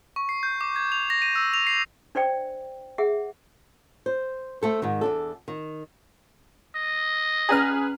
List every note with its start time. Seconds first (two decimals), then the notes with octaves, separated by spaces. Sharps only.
0.16 C#6
0.29 C7
0.43 G6
0.61 D6
0.76 G#6
0.92 F7
1.10 A#6
1.22 D#7
1.36 E6
1.54 F7
1.67 C7
2.15 D4 C5 D5 G5
2.98 G#4 E5 F#5
4.06 C5
4.62 A3 A4 C5
4.82 G#2 D#3
5.01 E2 D4 A4
5.48 D#3
6.75 D#5
7.49 C#4 G#4 B4 D5 A#5 F6